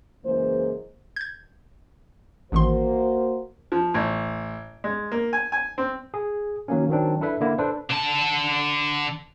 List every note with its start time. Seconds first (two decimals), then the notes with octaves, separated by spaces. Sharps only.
0.25 F#2 C#3 E3 G#3 A#3 C5
1.16 G6 G#6
2.52 A1 D#3 A#3 F#4 C5 C6
3.72 F3
3.94 A1
4.84 G#3
5.12 A#3
5.33 G#5
5.52 G#5
5.78 C4
6.14 G#4
6.68 D#3 F#3 A#3 C#4
6.89 D#3 F#3 C4 D4
7.21 D4 E4 A4 B4 E5
7.41 D3 A#3 E4
7.58 D4 A4 B4 C5
7.91 D3 A5